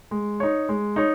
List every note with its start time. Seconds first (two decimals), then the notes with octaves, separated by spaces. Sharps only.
0.11 G#3
0.40 D#4 C#5
0.69 G#3
0.96 D#4 C#5